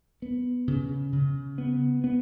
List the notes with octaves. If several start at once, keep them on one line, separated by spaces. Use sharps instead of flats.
B3
C#3
C#3
B3
B3